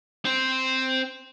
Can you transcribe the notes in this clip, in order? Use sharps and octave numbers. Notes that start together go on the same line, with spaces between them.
C4 C5